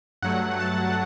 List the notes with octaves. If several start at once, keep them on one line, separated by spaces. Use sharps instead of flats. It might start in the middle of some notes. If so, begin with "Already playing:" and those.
G2 F#3 A3 F#5
A5